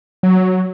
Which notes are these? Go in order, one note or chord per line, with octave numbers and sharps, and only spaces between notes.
F#3